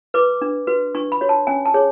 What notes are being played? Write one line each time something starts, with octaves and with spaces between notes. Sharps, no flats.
B4 D6
D4
F#4 B4
D4 C#6
B5
F#4 C#5
A5
C#4 G#5
A5
G#4 C#5